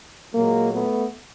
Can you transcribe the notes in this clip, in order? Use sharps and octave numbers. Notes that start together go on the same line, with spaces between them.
A#2 F#3 G#3 A#3
A3 B3